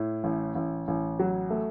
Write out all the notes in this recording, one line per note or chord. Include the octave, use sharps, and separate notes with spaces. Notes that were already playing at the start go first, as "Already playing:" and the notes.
Already playing: A2
A1
A1
A1
F#3
A3